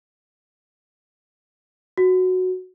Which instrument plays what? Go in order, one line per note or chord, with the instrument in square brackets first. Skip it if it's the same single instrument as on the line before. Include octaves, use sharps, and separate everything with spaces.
[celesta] F#4